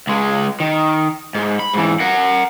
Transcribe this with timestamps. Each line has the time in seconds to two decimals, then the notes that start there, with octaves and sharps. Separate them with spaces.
0.07 C#2 G#3
0.60 D#3
1.35 G#2
1.60 B5
1.74 G#2 E3
2.00 A#4 F#5